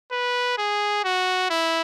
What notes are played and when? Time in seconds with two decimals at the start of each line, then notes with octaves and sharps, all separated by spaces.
0.12 B4
0.58 G#4
1.04 F#4
1.51 E4